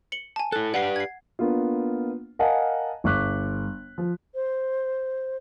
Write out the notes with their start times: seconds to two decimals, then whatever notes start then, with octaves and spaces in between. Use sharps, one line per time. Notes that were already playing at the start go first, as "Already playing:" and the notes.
0.12 C#7 F#7 G7
0.36 G#5 A5
0.52 E4 A4 F#6
0.74 G4 B4 D5 F#5 C7
0.96 G#6 C7
1.39 A#3 B3 D4 F4
2.39 A#4 D#5 F5 F#5 G#5 A5
3.04 G1 C#6 D6 F#6 B6
3.98 F3
4.35 C5